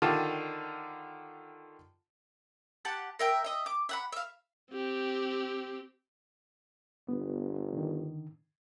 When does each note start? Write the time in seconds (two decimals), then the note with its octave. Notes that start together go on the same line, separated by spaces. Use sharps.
0.02 D3 D#3 F4 G4 A5
2.85 G4 F#5 A5
3.19 A#4 E5 G5
3.44 D#5 E5
3.66 D6
3.89 E5 F#5 B5
4.12 E5 F5
4.72 C4 G4
7.08 G1 B3
7.73 D3 D#3